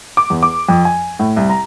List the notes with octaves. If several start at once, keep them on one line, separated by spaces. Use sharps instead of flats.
D6
E2
D6
F2
G#5
A2
C2
A#5